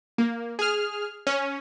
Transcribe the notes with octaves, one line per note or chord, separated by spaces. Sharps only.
A#3
G#4 F6
C#4